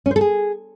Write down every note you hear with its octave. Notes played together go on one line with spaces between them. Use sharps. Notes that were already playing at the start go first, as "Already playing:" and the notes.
C#4
C5
A4
G#4